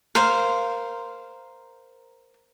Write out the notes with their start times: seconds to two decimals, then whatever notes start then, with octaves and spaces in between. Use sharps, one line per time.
0.15 A#4 C5 F5